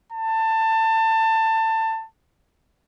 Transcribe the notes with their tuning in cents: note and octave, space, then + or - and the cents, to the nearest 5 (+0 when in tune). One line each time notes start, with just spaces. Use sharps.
A5 +20